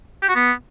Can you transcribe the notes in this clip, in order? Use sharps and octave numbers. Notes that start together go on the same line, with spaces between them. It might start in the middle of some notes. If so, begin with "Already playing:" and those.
G4
F#4
B3